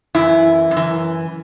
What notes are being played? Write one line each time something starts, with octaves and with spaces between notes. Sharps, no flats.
F#2 E3 E4
F#2
E3